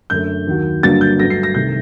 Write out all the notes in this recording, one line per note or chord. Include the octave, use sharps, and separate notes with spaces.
F#2 D3 A3 G6
D#2 D#3 F#3
G1 G2 F#3 A#3 D4 A6
G6
G2 F#3 A3 A#6
C7
A#6
C2 C3 D#3 A3 G6